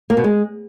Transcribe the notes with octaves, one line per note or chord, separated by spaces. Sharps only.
A#3
B2
G#3